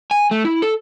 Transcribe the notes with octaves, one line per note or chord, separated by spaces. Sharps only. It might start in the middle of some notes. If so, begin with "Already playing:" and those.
G#5
A3
E4
A4